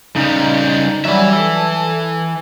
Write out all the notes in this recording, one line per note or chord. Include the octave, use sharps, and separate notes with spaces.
C#3 G3 D#4
E3 F#3 G3 E5
A4